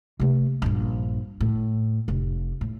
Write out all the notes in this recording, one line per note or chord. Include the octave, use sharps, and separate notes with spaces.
C3 A3
A#1 G2
A2
F1
A2